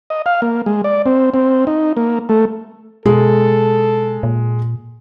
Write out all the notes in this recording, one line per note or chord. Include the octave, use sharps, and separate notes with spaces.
D#5
F5
A#3
G#3
D5
C4
C4
D#4
A#3
A3
B2 G#3 A4
A#2